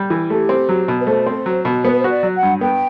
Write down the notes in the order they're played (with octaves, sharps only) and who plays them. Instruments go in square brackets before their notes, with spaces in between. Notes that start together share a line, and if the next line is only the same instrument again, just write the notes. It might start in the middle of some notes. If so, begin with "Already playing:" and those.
Already playing: [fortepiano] G3
E3
[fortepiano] A3 [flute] G4
[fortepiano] C4
F#3
B2
[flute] B4
[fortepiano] A3 [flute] C5
[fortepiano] C4
F#3
B2
[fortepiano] B3 [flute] C5
[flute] B4
C5
[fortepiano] F#4
[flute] D5
[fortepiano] F#3
[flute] F#5
[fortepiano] G2
[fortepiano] B3 [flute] G5